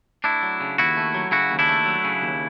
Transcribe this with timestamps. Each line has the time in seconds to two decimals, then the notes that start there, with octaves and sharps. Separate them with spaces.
0.24 A3 D4 E4
0.42 F#3
0.60 C#3
0.78 D#2 E4 F#4
0.97 A3
1.15 F#3
1.31 C#3 E4 F#4
1.51 D#2
1.59 D4 E4
1.69 A3
1.86 F#3
2.04 C#3
2.22 D#2